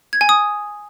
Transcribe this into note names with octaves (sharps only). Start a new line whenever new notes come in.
G#6
G#5
D#6